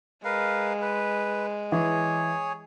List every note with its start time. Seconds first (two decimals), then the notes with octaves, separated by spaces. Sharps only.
0.24 G#3 A#4 B4 F5
0.81 B4
1.72 E3 G#4 C#5